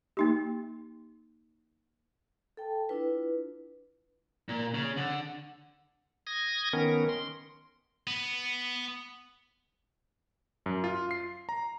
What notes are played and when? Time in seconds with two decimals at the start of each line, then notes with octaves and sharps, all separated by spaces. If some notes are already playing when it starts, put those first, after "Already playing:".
0.17 A#3 D#4 G4
2.57 A4 G5 A5
2.89 D4 E4 F4 B4
4.49 A#2
4.74 C#3
4.97 D3
6.27 D#6 G#6 A#6
6.73 D#3 B3 C#4 A#4
7.09 C6
8.07 B3
10.66 F#2
10.84 F4
11.11 C7
11.49 A#5